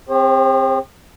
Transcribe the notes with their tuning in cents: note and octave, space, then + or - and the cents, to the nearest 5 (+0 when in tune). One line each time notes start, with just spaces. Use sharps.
C4 +0 G#4 -45 C5 +45